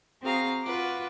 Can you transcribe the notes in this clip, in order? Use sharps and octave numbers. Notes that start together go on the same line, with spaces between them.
C4 F#4 G#4 F5 A#5
F4 F#4 B4 D6